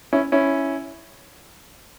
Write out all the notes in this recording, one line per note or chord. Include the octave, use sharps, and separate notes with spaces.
C#4 E4
C#4 E4